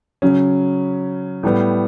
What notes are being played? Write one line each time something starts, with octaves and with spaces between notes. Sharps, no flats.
C#3 F#3 C#4
A2 G3 B3